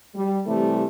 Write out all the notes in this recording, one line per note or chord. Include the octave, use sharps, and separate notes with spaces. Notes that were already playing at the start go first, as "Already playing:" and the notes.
G3
C3 E3 G3 A3